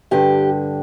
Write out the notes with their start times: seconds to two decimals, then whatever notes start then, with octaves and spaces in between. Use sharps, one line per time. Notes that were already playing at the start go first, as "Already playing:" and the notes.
0.11 G2 D3 G4